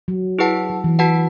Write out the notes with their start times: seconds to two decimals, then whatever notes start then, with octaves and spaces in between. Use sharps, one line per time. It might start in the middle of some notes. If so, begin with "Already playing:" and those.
0.08 F#3
0.39 E4 G#4 B4 F#5 A5
0.69 F#3
0.84 E3
0.99 F#4 B4 F#5 A5